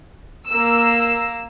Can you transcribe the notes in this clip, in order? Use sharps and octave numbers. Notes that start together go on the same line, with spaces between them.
A#3 E6